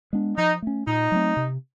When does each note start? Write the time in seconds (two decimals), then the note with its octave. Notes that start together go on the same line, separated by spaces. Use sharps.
0.13 G#3 B3 D4
0.37 F3 D#4
0.62 A3 C#4
0.87 A#2 D#4
1.12 F#3 A3 C4
1.37 C3